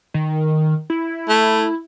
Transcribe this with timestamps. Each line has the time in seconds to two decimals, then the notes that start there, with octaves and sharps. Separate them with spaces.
0.14 D#3
0.90 E4
1.29 A3